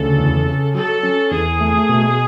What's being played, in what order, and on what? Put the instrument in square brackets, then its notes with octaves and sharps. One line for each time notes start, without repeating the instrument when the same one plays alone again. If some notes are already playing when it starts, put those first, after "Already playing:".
Already playing: [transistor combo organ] D2 C#3 [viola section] A4
[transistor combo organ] E2
C#3
[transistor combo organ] F#3 [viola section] A4
[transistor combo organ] C#4
[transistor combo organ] E2 [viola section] G#4
[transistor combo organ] A3
B2